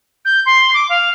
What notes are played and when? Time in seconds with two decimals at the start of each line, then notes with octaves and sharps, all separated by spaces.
0.25 G6
0.45 C6
0.74 D6
0.89 F5